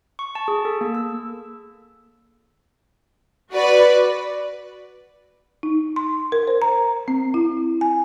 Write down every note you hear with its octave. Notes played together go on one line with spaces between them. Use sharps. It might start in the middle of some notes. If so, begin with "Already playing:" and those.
C#6
A5
G#4
A4
A#3
E6
F#4 B4 D5
D#4
C6
A#4
C5
A#5
C4
E4
G#5